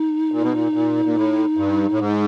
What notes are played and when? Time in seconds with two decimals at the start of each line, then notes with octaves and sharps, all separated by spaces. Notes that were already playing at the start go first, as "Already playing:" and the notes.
Already playing: D#4
0.32 A#2
0.43 B2
0.53 A#2
0.74 A#2
1.05 A#2
1.16 A2
1.57 G2
1.92 A2
1.99 G#2